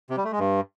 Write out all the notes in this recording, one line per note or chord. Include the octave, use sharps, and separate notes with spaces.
C3
G3
A3
G#3
G2